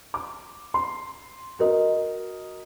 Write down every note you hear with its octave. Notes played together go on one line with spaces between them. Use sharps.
D6
C6
F#4 A#4 D#5